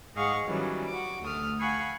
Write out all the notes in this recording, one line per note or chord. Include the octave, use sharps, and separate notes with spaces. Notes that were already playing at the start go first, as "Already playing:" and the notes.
G#2 G#4 D#5 F5 F#5 C#6
D#3 E3 F#3 G3 C#4
F#4 D6
D2 A3 D#6 F6
F5 F#5 G#5 B5 C#6